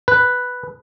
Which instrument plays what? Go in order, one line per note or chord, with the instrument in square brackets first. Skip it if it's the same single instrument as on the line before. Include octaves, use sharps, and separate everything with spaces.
[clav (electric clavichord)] B4